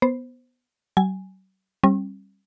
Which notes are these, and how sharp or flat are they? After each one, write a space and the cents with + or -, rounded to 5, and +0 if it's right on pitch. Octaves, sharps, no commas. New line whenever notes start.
B3 +0 C5 +0
F#3 +45 G#5 +0
G3 +0 C#4 -45